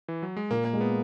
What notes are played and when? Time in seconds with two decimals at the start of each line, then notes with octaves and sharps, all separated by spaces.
0.08 E3
0.23 F#3
0.37 G#3
0.51 A#2 A#3
0.65 A#3
0.73 G#3
0.81 B3